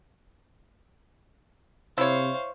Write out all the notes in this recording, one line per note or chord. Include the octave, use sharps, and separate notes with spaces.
C3 E4 C5 C#5 F5